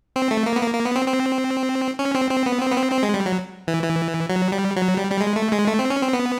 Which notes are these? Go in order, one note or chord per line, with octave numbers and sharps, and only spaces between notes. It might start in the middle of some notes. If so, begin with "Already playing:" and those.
C4
A3
A#3
B3
A#3
A#3
B3
C4
C4
C#4
C4
C4
B3
C4
B3
C4
C4
G#3
G3
F#3
E3
E3
F#3
G3
F#3
G3
G3
G#3
A3
G#3
A3
C4
C#4
C4
B3